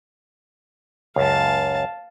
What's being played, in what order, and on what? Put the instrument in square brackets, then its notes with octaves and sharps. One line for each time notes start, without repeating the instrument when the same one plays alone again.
[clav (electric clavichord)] C#2 F#2 [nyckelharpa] F5 A5